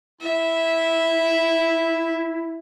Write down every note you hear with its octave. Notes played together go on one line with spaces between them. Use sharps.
E4 E5